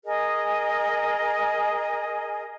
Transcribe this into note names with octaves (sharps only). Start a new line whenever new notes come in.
G#4 A#4 D#5